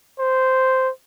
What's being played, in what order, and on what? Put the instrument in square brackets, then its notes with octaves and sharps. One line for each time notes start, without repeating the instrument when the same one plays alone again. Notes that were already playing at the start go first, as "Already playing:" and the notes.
[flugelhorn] C5